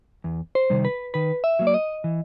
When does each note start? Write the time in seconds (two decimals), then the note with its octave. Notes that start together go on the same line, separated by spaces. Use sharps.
0.24 E2
0.55 C5
0.70 C3 D#3 G3
0.85 B4
1.14 D#3 B4
1.44 E5
1.59 F#3 A#3
1.67 D5
1.74 D#5
2.04 E3